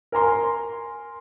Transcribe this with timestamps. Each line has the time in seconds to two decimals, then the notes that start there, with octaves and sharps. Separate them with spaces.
0.12 A#4 G#5 A#5 C6